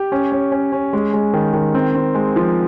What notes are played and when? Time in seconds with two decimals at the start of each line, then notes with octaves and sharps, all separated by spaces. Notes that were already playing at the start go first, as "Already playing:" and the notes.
Already playing: G4
0.12 C#4
0.32 C#4
0.52 C#4
0.72 C#4
0.93 G#3
1.13 G#3
1.34 D#3
1.53 D#3
1.75 C4
1.95 C4
2.15 G#3
2.36 F3